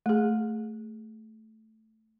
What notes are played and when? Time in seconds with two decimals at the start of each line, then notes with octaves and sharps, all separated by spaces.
0.06 A3 G#4